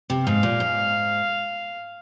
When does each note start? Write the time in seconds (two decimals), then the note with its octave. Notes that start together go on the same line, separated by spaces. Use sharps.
0.10 C3
0.26 G#2 F5
0.43 A#2
0.60 G#2